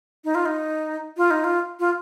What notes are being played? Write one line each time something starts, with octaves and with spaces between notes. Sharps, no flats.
D#4
F4
D#4
F4
D#4
F4
F4